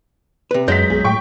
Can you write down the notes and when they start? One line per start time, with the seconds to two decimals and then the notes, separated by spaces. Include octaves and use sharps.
0.51 C3 B4
0.68 F#2 F#3 G#3 G6 B6
0.90 B1 G#4
1.04 A2 G5 C#6